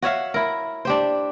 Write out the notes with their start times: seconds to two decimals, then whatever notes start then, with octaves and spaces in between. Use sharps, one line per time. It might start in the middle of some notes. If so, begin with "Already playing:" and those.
0.02 F#4 C#5 E5 F5
0.34 E4 A#4
0.85 D4 G4 C5